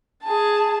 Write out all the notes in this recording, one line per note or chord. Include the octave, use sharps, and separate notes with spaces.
G#4 A5